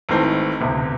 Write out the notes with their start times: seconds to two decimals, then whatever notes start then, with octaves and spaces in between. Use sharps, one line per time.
0.09 G#1 G#2 E3 A3 C4
0.61 E1 D2 C3